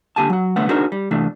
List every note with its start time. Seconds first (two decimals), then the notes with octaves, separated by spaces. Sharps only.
0.16 D3 A#3 G4 G#5 A5
0.30 F#3 F#5
0.56 C2 D3 A3 B3 C#5 F#5
0.69 D4 D#4 F#4 G#4 A#4 C5
0.92 G3
1.11 C3 E3 A3 D4